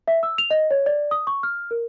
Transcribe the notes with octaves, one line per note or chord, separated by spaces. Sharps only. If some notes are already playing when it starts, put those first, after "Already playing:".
E5
E6
F7
D#5
C#5
D5
D#6
C#6
F6
A#4